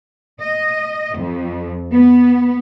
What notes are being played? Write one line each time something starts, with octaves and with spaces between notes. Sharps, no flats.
D#5
F2
B3